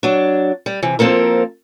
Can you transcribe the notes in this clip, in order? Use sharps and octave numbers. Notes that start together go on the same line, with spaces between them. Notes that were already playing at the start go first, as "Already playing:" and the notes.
F#3 D4
G3
C3 E3
F3 A#3 C4 A4 A#4